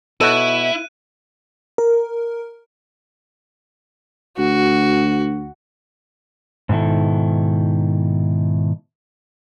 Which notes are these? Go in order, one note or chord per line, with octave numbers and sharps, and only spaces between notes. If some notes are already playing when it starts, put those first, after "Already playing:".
B2 E4 F#4 A4 C#5 F#6 D#7
A#4
D2 F#4
G#2 B2 D#3 E4 A4